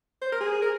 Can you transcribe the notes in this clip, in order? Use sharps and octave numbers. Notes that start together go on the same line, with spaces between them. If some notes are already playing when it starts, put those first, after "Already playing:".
C5
A#4
G#4
A#4